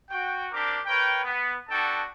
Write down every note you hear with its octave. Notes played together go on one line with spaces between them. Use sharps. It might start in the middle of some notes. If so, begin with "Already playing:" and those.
F#4 G5
C4 D4 G4 A#4 D6
A#4 B4 C#5 G5
B3
B3 D4 F#4 A4 G5 A5